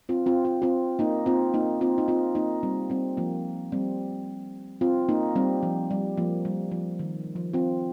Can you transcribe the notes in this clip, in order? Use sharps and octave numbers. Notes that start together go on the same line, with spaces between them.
C4 F4
C4 F4
F4
C4 F4
A#3 D#4
C4 F4
A#3 D#4
C4 F4
D#4
C4 F4
A#3 D#4
G3 C4
G3 C4
F3 A#3
G3 C4
C4 F4
A#3 D#4
G3 C4
F3
G3
F3 A#3
G3
F3
D#3
F3
C4 F4